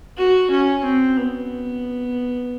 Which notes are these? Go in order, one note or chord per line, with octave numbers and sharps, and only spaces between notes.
F#4
C#4
C4
B3